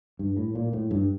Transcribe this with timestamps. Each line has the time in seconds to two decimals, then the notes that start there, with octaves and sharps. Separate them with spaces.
0.19 G2
0.37 A2
0.55 A#2
0.73 A2
0.91 G2